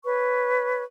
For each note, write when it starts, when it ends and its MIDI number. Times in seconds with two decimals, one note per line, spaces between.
0.05 0.83 71
0.05 0.83 73
0.05 0.83 85